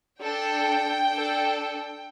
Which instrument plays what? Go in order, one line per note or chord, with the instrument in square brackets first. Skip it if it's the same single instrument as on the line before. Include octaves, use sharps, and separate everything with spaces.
[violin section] D4 A4 G5
D4 A4